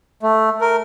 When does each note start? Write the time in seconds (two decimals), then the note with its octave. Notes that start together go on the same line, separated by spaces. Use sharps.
0.23 A3
0.61 A#4